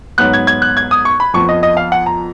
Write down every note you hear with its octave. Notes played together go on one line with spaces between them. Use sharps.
G#2 F#3 B3 F#6
G#6
G#6
F#6
G#6
D#6
C#6
B5
F2 F3 B3 C#6
D#5
D#5
F5
F#5
A#5